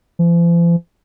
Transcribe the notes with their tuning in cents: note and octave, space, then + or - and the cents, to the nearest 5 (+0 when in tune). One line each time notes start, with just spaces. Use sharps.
F3 -45